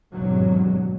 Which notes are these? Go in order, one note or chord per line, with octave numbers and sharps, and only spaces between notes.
G#1 E2 G2 B2 F#3